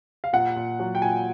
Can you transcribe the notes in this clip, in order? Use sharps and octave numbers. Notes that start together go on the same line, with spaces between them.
F5
A#2 F#5
A#2
F#3
G5
A#2 G#5